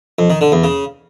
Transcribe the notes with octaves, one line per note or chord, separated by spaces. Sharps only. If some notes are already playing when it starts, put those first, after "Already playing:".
F2
D#3
D3
E2
C#3